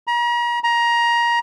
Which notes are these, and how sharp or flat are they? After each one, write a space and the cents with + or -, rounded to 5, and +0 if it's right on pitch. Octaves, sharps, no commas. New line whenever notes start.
A#5 +40
A#5 +20